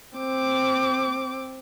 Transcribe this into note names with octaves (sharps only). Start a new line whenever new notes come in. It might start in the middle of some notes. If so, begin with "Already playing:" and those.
C4 D6